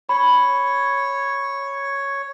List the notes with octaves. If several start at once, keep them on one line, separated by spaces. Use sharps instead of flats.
C#5 B5